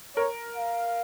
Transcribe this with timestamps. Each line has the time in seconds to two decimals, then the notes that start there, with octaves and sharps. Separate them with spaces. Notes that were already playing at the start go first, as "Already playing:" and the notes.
0.16 A#4 C#5
0.56 F5